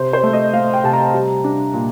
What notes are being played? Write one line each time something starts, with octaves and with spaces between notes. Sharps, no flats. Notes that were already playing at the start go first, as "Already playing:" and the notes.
Already playing: C3 C5
C5
A3
D#5
A3 F5
G5
C3 A5
A#5
G3
D4
A#2